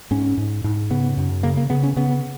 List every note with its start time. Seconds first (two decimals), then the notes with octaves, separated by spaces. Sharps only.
0.11 G#2 C#4
0.37 G#2
0.64 G#2
0.91 C#3 B3
1.17 F#2
1.43 C#3 A#3
1.57 A#3
1.70 C#3 B3
1.83 C#4
1.96 C#3 B3